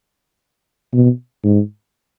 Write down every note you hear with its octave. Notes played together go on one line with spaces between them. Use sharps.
B2
G#2